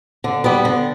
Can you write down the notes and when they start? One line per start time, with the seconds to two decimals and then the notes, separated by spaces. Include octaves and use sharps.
0.24 D3
0.44 G3 B3
0.65 D3